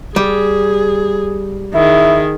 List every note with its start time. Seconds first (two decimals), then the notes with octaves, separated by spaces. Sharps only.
0.16 G3 G#4
1.75 D#3 E4 G#4